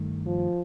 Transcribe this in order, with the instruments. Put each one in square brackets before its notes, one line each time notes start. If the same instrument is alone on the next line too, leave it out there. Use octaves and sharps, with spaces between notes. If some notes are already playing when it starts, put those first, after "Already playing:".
Already playing: [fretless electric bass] G2 D#3 A3
[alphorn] F3